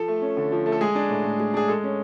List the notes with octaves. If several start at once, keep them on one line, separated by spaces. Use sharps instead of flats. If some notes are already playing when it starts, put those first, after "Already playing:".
Already playing: F3 A4
A3
C#4
D3
F3
A3
A4
G#3 G#4
D4
A2
A2
G#3
D4 G#4
G#3 A4
C#4